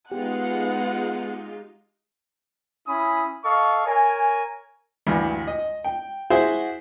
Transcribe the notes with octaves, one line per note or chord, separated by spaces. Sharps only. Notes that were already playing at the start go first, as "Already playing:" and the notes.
G#3 B3 D#4 F4 G4 F#5
C#4 E4 G#5 B5 D#6
A4 D#5 F5 C#6
A#4 C#5 G#5
D2 G2 E3
D#5
G5
E4 F#4 G#4 C5